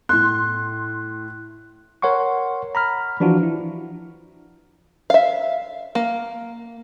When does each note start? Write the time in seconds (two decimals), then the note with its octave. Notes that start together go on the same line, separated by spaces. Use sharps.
0.09 A2 C6 F#6
2.02 A#4 C#5 F#5 C6 C#6
2.75 A#5 B5 F6
3.20 E3 F3 D4 F4 F#4
3.43 E4
5.10 E5 F5
5.95 A#3